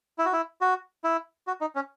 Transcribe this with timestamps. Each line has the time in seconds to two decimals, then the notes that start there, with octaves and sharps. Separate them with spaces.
0.18 E4
0.26 F#4
0.33 E4
0.61 F#4
1.04 E4
1.47 F#4
1.61 D#4
1.75 C#4